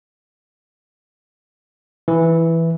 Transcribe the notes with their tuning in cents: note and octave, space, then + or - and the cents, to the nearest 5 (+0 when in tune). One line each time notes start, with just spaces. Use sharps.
E3 +0 E4 +0